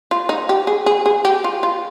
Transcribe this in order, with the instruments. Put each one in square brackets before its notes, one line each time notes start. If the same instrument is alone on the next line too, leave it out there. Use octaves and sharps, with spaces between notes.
[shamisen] F4
D#4
G4
G#4
G#4
G#4
G4
F4
F4